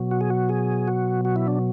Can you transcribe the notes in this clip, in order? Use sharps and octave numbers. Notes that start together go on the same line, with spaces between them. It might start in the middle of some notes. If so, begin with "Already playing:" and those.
Already playing: B2 F#3
F#4
G#4
F#4
G#4
F#4
F#4
E4
D4